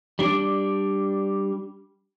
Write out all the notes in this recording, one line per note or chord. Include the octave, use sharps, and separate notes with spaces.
G3 D4 D5